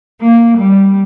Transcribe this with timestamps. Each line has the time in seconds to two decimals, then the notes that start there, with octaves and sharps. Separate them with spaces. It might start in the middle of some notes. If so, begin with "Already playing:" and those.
0.22 A#3
0.58 G3